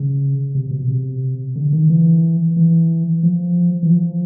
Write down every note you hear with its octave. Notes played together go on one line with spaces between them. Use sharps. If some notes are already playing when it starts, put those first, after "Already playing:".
Already playing: C#3
C3
B2
C3
D3
D#3
E3
E3
F3
E3
F3